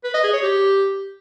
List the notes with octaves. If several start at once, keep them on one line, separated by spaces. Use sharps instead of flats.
B4
D#5
G#4
C#5
G4